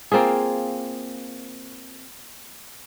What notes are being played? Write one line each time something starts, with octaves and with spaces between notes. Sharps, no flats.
A#3 C4 F4 G#4